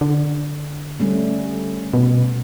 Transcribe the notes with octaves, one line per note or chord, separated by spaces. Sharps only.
D3
G3 A3 C#4
B2